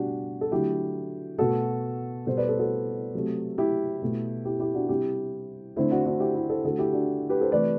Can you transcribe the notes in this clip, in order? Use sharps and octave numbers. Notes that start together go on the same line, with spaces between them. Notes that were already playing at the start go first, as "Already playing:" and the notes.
Already playing: B2 G3 D4 F#4 G4
A4
D3 F#3 A3 E4 G4
B2 A3 F#4 A4
B2 G3 A4 C5
B4 D5
A4 C5
F#4 A4
C3 F#3 A3
E4 G4
B2 A3
E4 G4
E4 G4
D4 F#4
C3 G3 E4 G4
D3 A3 C4 E4
D4 F#4
D4 F#4
E4 G4
E4 G4
A4 C5
D3 A3 F#4 A4
E4 G4
D4 F#4
G4 B4
A4 C5
C3 E3 A3 B4 D5